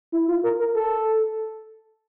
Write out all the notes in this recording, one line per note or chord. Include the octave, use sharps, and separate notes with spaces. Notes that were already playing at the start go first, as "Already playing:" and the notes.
E4
F4
A#4
A#4
A4